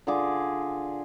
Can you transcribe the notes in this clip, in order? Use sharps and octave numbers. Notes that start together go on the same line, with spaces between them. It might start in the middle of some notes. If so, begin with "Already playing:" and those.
D3 F4 G#4 D6